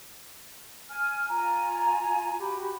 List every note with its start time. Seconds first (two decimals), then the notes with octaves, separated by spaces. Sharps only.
0.88 G#5 F6
1.28 F4 G#5 A#5
2.39 F#4 G4 B5